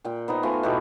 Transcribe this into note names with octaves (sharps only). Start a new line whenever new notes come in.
A#2 G5
B3 D#4 C5 A#5
A3 B3 F4 G#5
B2 E4 G4 A4